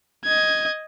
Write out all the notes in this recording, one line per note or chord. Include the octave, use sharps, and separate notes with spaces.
D#5 G#6